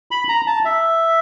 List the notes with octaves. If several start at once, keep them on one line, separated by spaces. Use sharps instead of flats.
B5
A#5
A5
E5